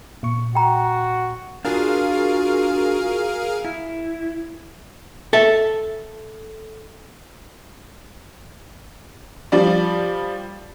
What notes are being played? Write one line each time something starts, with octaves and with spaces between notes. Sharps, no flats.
A#2 C#6
F#4 G5 A#5
D4 F4 F#4 G#4 A#4 F5
E4
A4 E5 A5
F3 G3 D5